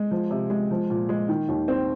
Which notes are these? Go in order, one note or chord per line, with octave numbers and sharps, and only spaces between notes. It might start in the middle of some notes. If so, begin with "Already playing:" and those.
Already playing: G#3
F3
C3
G#3
F3
A#2
G#3
D#3
D#2
C4